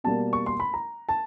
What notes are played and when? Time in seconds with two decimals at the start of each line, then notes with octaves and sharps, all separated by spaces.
0.04 B2 G3 A#3 A5
0.33 C#6
0.46 C6
0.60 B5
0.74 A#5
1.09 A5